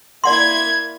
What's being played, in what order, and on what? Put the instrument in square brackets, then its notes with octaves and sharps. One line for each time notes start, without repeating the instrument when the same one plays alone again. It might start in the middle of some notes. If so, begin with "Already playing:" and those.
[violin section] A#3 E4 G#6 [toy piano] D5 F#5 C6